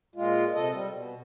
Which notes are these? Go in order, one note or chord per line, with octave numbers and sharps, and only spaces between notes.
A#2 G#3 F4
C3 A4 D#5
G3
B2